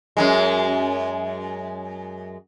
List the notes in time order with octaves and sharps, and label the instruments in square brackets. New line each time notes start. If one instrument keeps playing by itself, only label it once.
[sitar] F#2 A2 G#3